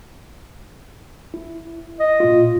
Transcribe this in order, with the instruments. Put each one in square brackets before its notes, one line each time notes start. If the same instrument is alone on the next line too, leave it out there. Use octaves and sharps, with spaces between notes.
[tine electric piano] E4
[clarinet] D#5
[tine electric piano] A#2 E4 F4